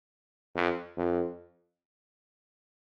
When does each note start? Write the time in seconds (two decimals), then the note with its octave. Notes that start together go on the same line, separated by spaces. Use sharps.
0.56 F2
0.97 F2